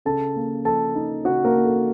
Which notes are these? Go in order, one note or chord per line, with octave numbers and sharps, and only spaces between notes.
C#3 A4 A5
A#3
F3 A4 A5
D#4
C#3 F#4 F#5
A#3 A#4
A#3
A4